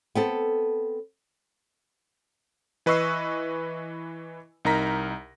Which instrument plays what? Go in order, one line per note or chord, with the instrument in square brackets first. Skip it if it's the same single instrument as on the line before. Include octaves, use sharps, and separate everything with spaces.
[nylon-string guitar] B3 C4 A4
[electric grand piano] E3 B4 D#5 C#6 E6 C7
C2 D#4 A#4 A#5 A#6 B6